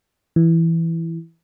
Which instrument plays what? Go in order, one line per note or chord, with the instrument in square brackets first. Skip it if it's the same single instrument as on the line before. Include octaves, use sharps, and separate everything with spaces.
[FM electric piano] E3